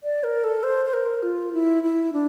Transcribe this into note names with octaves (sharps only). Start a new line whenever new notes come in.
D5
A#4
A4
C5
C5
A#4
F4
E4
E4
D4